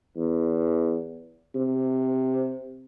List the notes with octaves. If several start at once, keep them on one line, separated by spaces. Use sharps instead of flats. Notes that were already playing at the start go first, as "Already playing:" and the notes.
E2
C3